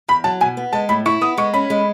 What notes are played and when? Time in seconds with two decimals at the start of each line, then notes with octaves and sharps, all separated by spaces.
0.08 E2 B5
0.24 F#3 A5
0.41 B2 G#5
0.57 B3
0.73 G#3 A5
0.89 A2 B5
1.06 E4 C#6
1.21 B3 D#6
1.37 G#3 C#6
1.54 C#4 B5
1.70 G#3